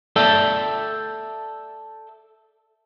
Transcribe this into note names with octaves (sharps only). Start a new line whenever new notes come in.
A4 D5 E5 G5